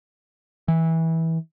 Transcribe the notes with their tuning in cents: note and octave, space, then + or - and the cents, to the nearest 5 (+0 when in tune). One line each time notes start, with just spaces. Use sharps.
E3 -20